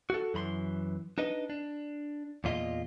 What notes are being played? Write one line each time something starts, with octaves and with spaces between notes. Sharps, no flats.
F#4 A4
F#2 E3 B5 C6
D4 D#4 B4 D#5
D4
E2 A#2 F4 A4 D#5